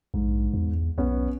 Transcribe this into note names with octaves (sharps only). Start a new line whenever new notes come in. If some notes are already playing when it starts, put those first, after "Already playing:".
A#1 G#2
E2
B1 B3 C#4